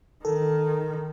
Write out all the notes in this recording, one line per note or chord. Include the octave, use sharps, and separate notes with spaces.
D#3 A4 A#4